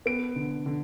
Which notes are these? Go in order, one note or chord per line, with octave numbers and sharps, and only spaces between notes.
B3 D7
D3
D3